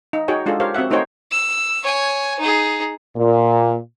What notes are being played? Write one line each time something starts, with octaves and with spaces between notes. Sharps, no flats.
D#4
D#4 F#4 G#4 C#5 G5
G#3 D4 F4 G#4 A4
G4 A#4 C5 C#5 F5
C4 F#4 E5 F#5
A3 D#4 F#4 C5 C#5 G5
E6
C#5 G#5
D#4 G#4
A#2